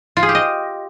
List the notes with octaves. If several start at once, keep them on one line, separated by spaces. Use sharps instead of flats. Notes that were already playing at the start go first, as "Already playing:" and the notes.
F4
G#4
G4
D#5